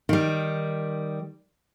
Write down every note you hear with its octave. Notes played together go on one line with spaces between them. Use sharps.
D#3 G3